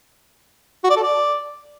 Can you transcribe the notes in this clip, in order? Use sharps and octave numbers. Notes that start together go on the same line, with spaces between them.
F#4
D5
A4
D5